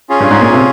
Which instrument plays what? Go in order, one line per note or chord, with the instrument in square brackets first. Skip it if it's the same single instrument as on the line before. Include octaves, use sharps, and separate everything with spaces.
[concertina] C#4 F4 G#4
[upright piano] G2
G#2
A#2
C3